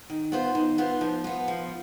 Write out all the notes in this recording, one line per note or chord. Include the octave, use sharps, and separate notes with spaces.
D#3
B3 F4 C5
D#3
B3 F4 C5
F3
B3 F4
F3